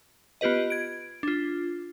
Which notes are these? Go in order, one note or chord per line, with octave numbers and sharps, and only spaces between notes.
B3 F4 G4 B4 D#5
G#6 D7
D4 F4